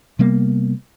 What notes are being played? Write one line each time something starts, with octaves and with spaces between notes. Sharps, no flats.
C3 G3 A#3 B3